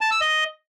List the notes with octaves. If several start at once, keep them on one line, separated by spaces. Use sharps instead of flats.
A5
E6
D#5